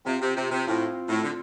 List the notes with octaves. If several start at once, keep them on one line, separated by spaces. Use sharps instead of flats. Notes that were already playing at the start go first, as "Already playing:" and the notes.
C3 C4 F4 C5 F5
C3
C3
C3
A2 C4 F4 C5 F5
A2
D3